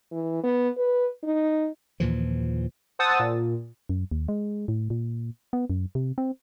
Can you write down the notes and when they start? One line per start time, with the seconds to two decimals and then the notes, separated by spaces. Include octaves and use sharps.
0.12 E3
0.44 B3
0.77 B4
1.24 D#4
2.00 D#2 A#2 E3 F3
2.99 C5 F#5 A5 D#6 E6 A6
3.19 A#2
3.89 F#2
4.11 D#2
4.28 G#3
4.68 A2
4.90 A#2
5.53 B3
5.70 F#2
5.95 C3
6.18 C4